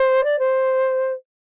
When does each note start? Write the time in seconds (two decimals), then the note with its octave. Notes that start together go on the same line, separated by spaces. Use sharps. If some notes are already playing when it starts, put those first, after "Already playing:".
Already playing: C5
0.24 D5
0.39 C5